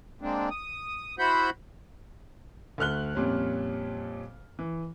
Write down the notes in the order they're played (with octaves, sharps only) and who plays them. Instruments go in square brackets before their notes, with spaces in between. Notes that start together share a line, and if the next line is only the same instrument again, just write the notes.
[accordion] G#3 A#3 C4 D4
D#6
E4 F#4 C5 F#5 B5 G6
[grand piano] D2 A3 F6 F#6 G7
F2 A#2 G3 C#4
E3